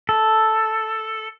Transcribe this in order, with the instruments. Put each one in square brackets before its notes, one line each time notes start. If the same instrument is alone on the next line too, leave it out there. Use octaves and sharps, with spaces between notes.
[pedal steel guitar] A4